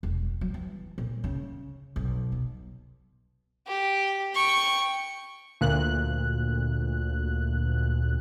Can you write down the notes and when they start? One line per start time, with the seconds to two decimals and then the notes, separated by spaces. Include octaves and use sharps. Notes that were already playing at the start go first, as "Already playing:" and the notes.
0.03 E1
0.41 F#3
0.54 E3
0.98 A#2
1.24 C#3
1.96 B1
2.32 B2
3.67 G4
4.34 G5 C#6
5.61 D2 A#2 F#6